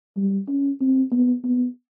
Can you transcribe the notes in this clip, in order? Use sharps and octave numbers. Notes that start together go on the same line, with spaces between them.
G3
C#4
C4
B3
B3